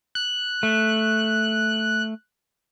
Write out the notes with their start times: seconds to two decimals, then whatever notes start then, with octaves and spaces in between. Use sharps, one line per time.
0.15 F#6
0.63 A3